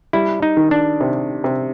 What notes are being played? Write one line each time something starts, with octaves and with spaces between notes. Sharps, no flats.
G3 E4
D#4
D#3
D4
C3
C3